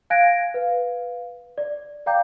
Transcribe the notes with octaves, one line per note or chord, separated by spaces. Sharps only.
F5 G#5 F#6 G#6 A#6 D7
B4 F5
D5
D5 F5 G5 A#5 D6 G6